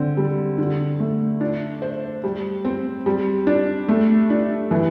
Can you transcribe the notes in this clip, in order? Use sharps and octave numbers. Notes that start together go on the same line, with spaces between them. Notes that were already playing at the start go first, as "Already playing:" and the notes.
Already playing: D3 C4
G3
D3
A3
D4
C5
G3
C4
G3
D4
A3
D4
E3